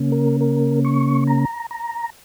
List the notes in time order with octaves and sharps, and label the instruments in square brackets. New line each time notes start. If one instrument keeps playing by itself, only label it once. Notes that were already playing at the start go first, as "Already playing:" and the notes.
Already playing: [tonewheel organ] C#3 A#3 C#4
A#4
A#4
C#6
A#5
A#5